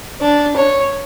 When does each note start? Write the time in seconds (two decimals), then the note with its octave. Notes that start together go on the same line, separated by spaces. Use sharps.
0.21 D4
0.56 C#5